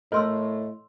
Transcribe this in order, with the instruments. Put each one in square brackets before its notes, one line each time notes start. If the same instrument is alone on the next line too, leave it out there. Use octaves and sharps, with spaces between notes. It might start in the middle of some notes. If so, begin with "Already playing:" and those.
[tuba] A2 [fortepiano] A3 A#4 F6 [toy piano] C#5 C6 E6 [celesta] D#5